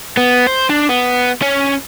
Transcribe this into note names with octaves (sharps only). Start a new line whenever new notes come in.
B3
C5
D4
B3
C#4